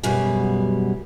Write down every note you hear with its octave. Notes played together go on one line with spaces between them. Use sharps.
F#2 B2 G3 G#4